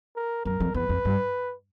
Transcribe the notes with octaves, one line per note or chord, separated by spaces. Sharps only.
A#4
F#2 A#4
F2
E2 B4
F2
G2